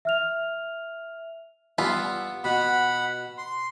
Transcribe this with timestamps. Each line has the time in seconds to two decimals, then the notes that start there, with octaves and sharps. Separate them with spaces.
0.05 E5 F6 F7
1.78 G3 B3 E4 F4
2.44 B2 F#5 B5
3.38 C6